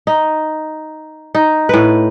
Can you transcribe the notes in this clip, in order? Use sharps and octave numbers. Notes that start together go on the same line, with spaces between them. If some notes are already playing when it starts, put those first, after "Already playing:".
D#4
D#4
A2 B4